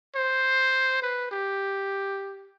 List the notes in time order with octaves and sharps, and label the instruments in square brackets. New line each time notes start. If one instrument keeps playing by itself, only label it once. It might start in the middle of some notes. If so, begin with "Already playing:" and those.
[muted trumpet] C5
B4
G4